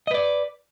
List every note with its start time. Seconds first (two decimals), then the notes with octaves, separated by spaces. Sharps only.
0.07 D#5
0.11 B4
0.14 D5